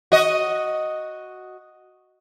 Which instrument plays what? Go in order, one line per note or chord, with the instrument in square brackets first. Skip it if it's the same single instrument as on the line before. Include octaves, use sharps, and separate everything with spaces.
[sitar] F#4 D#5